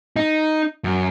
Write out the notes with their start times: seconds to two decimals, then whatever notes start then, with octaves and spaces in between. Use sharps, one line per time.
0.16 D#4
0.84 F#2